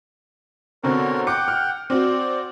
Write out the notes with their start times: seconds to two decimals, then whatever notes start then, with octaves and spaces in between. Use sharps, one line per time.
0.84 B2 D3 C4 A#4 C#5
1.27 F#5 G5 D6 C#7
1.48 F6
1.90 C4 F#4 D5